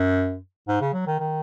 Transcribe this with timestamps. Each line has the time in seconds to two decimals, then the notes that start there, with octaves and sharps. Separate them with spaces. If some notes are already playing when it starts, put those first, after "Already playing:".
Already playing: F#2
0.68 G#2
0.81 C#3
0.93 F#3
1.07 D#3
1.20 D#3